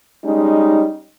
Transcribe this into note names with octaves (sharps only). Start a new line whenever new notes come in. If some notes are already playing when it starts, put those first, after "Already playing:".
G3 G#3 C#4 D#4